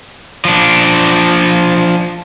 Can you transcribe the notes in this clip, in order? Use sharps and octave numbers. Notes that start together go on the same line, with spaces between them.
F3 D4